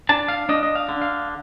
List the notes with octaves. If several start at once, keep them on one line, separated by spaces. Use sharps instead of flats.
D4 A5
F5
D4 D#5
D#5
F5
D3
F5